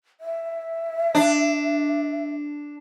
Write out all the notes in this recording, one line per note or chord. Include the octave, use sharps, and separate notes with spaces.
E5
D4